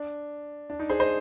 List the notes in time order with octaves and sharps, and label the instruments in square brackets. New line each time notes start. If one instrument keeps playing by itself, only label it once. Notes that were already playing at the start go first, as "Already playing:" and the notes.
Already playing: [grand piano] D4
D4
D#4
G#4 C5
C5 D#5